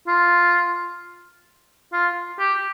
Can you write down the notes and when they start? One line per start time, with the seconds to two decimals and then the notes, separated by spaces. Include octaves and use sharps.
0.07 F4
1.92 F4
2.39 G4